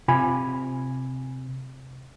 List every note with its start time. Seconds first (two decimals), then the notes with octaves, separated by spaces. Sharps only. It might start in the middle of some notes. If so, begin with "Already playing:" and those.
0.08 C3 F4 G#5 B5